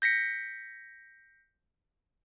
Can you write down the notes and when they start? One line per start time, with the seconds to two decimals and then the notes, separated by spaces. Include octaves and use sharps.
0.02 G6 A#6 B6 C#7